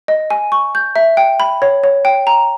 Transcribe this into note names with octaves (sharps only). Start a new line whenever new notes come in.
D#5
G#5
C#6
G6
E5
G5
B5
C#5
C#5
G5
A#5